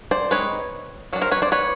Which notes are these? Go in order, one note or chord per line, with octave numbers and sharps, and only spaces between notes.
C5 D5
G#3 C4 D#4 B4 C#5
D#3 F#3 D4
A#4 C5
B4 C#5
C5 D5
B4 C#5